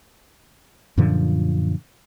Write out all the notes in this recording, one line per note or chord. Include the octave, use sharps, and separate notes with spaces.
F#2 A#2 D3 F3